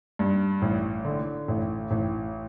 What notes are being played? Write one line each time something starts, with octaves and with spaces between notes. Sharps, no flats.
G2
A1
D3
A1
A1